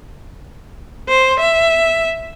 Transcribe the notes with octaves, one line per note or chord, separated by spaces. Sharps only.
C5
E5